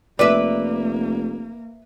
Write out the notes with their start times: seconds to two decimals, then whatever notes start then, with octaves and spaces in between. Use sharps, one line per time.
0.19 F1 A#3 B4 D5 E5